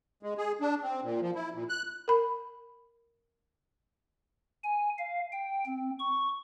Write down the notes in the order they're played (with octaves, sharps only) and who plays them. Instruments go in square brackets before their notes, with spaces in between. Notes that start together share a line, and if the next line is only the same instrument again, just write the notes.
[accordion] G#3
G#4
D4
C4
A#2
F3
E4
A#2
F#6
[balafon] A#4 B5
[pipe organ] G#5
F5
G5
C4
C#6